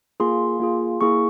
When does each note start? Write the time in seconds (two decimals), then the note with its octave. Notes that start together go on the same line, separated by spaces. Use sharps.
0.20 A#3 F4 G#4 C6
0.60 A#3 F4 G#4
1.01 A#3 E4 G#4 C#6